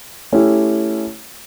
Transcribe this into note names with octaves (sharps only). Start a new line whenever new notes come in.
A3 C#4 E4 G4